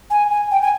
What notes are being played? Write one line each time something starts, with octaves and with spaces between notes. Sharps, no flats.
G#5
G#5
G5
G#5